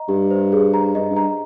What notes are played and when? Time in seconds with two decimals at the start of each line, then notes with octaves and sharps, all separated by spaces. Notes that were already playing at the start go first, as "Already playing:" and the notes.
Already playing: D#5 A#5
0.08 G2 G4
0.31 C5
0.52 G#4
0.74 A#5
0.95 G2 D#5
1.10 G2
1.17 A#5